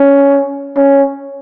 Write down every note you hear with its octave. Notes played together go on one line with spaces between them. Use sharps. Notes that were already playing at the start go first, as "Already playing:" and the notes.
Already playing: C#4
C#4